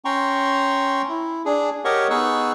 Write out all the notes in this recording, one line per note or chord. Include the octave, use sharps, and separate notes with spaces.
C#4 G5 A#5 C6 C#6
E4
D4 G#4
G4 A#4 C#5 D#5 F#5 C#6
B3 D#4 G#4 C#6 E6 F#6